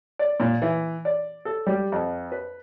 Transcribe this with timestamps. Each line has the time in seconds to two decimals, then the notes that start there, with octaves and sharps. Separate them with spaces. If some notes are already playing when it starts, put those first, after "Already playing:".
0.19 D5
0.40 A#2
0.62 E3
1.05 D5
1.45 A4
1.66 G3
1.92 F2
2.32 B4